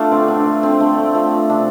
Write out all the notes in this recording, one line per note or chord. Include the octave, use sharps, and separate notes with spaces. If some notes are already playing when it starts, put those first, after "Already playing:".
Already playing: A3 D4 F4
D3 C4
D4
F3 A3
C4
D3 A3
F3 A3 C4
C3 D4